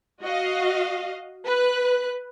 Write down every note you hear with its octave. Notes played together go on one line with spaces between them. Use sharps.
F#4 D#5 F5
B4 F#6